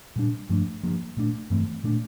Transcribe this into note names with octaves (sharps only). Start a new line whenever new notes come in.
A#2 G3 D4
G2 F3 A3 D4
G2 F3 A#3
A#2 A3 D4
G2 E3 A3 C4
A#2 A3 D4